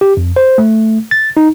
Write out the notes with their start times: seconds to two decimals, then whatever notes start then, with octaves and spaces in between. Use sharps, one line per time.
0.01 G4
0.17 F2
0.36 C5
0.58 A3
1.11 A6
1.37 D#4